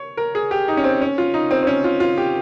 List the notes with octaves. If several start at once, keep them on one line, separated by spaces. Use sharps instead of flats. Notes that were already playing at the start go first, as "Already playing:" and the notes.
Already playing: C#5
A#4
G#4
G4
D#4
C#4
C4
C#4
F4
D#4
C4
C4
C#4
F4
F4
G4